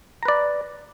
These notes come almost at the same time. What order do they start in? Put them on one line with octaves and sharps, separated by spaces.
A#5 B4 D5